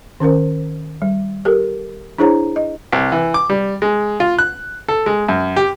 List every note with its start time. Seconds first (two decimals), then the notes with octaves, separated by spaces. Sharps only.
0.20 D#3 C#4 A#4 C5
1.02 G3
1.45 G4 A4 A#4
2.18 D4 E4 G#4 C5 C#5 A#5
2.56 D#5
2.93 C2
3.12 E3
3.34 D6
3.50 G3
3.82 G#3
4.20 F4
4.39 F#6
4.88 A4
5.06 G#3
5.29 F#2
5.57 G4